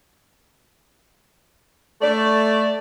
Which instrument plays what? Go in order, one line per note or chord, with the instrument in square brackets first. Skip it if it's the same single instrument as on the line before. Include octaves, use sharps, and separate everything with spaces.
[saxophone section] A3 D5